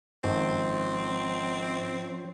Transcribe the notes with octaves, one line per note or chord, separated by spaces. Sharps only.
G#1 F3 C4 C#4 C5